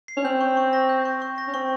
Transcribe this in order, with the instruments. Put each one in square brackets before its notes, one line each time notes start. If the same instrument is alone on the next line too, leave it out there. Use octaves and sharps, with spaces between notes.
[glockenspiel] C7
[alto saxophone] C#4
[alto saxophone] C4 [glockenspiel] G6
[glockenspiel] C#6
C#6
A#6
G6
C#6
C#6
A#6
[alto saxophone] C#4
[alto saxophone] C4 [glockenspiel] C#6